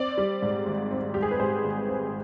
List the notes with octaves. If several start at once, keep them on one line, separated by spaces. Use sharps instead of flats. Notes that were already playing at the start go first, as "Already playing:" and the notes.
Already playing: C4 D5
G3
G#2
G#1
C4
G3 G4
G#4
B4
G#2 C5
G#1
C4